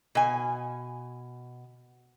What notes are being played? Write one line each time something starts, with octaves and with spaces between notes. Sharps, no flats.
B2 G#5